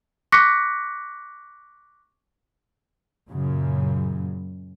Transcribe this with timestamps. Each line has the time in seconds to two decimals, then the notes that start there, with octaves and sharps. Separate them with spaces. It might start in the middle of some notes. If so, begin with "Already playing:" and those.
0.32 C#6 D6 F#6 A#6 B6 C#7
3.30 F#2 A#2 C#3